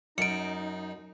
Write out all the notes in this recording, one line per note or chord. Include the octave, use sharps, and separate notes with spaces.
F#2 D#4 C#7 D7